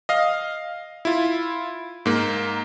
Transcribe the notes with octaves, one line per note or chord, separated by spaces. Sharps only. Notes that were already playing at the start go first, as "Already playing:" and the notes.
D#5 F5
E4 F4
G#2 A#3